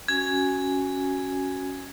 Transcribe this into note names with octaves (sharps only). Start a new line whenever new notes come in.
C#4 F#4 G#5 G#6